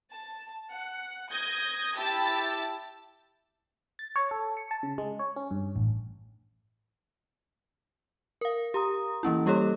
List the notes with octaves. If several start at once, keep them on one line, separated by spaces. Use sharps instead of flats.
A5
F#5
D#6 G6 G#6 A#6
E4 G4 A5 E6 A6
A6
C#5
A4
C#7
A5
C#3
G#3
C#5
C#4
G2
A1
A#4 F5
G4 A#5 D#6
E3 A#3 C#4 E4
G3 A#3 G4 A4 C#5